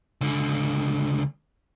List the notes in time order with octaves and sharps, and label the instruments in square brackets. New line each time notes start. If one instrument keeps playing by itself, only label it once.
[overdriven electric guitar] C#2 D3